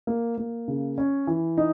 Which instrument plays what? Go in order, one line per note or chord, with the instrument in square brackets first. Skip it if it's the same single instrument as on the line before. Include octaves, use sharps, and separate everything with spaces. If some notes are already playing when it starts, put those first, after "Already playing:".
[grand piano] A#3
A#3
C#3
C#4
E3
D#4